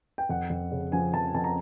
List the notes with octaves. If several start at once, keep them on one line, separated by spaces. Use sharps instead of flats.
G5
F2 F#5
F2
C#3
F3 G#5
F2 A5
F2 A5
A#5